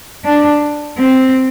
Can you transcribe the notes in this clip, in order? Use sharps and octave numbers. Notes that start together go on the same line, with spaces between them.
D4
C4